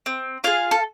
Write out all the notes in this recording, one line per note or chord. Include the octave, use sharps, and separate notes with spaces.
C4
F4 G#4 F5
A4